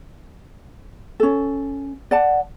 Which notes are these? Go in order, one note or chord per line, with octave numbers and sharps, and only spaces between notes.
C#4 A4
D5 F#5 A5